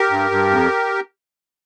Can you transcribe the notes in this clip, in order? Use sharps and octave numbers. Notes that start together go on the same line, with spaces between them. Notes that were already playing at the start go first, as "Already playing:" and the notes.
Already playing: G4 A#4
G2
G2
F2